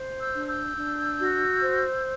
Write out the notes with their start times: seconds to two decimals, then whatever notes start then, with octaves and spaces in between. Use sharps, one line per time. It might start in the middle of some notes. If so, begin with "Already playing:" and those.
Already playing: C5
0.20 E6 G6
0.35 D4
0.49 E6 G6
0.77 D4
1.19 F#4
1.62 C5